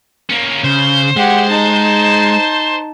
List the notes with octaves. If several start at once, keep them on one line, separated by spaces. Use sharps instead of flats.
A#3 C#4
C#3 C5
G#3 G4 F#5
D#4 A5